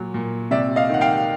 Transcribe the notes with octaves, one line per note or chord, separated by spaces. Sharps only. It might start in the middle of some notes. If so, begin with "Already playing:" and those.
Already playing: A#2 F#3
A#2
C3 D5 E5
D#5 F5
D#3 F#5
F5 G5